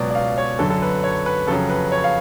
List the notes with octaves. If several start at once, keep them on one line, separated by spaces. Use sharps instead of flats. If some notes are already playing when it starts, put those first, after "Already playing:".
Already playing: C#2 B2 F#3 D5
D5
F5
C#5
F#2 D3 F#3 A4
A4
B4
C#5
B4
F2 C#3 F#3 A4
B4
C#5
F5